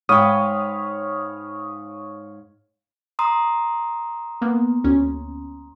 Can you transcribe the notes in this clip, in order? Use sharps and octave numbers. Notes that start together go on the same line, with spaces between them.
G#2 C#5 F5 G5 B5 D#6
A#5 C6 D#6
A#3 B3
D2 C#4